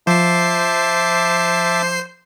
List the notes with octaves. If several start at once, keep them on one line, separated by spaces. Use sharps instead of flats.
F3 C5 E5 A5 D6 C7